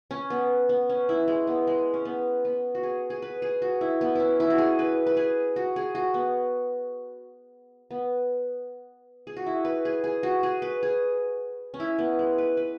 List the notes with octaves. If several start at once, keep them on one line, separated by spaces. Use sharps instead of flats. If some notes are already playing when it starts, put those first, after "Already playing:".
C#4
B3
B3
C#4
E4
G#3
B3
G#3
C#4
B3
B3
F#4
G#4
G#4
B4
G#4
F#4
E4
B3
C#4 E4
E4
F#4
G#4
B4
B4
G#4
F#4
G#4
F#4
B3
B3
G#4
F#4
E4
B4
G#4
G#4
F#4
G#4
B4
G#4
C#4
E4
B3
G#3
B4
B4